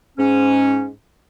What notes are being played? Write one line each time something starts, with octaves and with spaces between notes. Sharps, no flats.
G#2 C#4